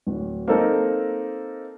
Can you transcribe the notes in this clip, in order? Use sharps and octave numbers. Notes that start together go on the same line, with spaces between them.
D1
A#3 C4 D#4 A4 A#4